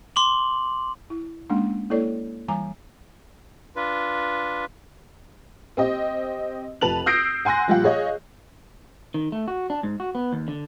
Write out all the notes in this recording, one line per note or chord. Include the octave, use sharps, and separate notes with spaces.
C6 D6 F#7
E4
G#3 A#3 C#4 D4
A#3 E4 A4 C#5 D5
E3 G3 G#5 A#5 D6
D4 F4 B4
C4 G4 D#5
F1 F3 B4 A5 F7 F#7
D#6 E6 G6 A#6 C7 D7
F#5 G#5 C6 F#6 A#6
A#2 F3 G3 F4 G4 F#5
G#4 C#5 D#5 F5
D#3
A3
F#4
D4
G#2
F#4
B3
D#2
D3